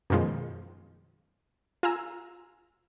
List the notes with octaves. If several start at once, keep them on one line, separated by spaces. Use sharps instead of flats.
F#2 B2 D#3 F3 G#3
F4 G#5 A#5 E6